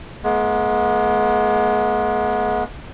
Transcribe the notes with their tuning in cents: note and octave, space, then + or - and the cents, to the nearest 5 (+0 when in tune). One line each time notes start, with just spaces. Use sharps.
G#3 +35 B3 -35